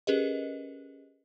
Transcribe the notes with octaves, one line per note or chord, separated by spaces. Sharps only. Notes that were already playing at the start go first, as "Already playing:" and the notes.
C#4 G4 G#4 A#4 B4 D#5